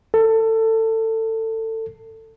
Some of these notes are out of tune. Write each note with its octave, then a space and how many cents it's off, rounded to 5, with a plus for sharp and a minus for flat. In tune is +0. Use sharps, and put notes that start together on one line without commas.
A4 +25